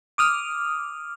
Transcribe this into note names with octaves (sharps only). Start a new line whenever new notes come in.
D6 D#6 F6